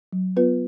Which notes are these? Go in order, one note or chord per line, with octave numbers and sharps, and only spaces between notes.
F#3
B3 F4 B4